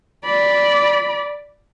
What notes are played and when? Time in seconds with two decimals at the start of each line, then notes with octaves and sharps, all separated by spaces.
0.25 D5 B5